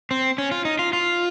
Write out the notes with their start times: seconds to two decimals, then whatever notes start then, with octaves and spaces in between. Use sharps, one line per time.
0.11 C4
0.38 C#4
0.52 F4
0.65 D#4
0.79 F4
0.93 F4